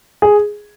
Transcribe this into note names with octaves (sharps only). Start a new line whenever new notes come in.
G#4